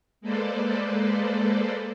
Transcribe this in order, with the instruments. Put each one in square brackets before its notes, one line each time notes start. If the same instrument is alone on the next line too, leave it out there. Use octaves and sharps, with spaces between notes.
[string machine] G#3 A#3 A4 B4 C5 D5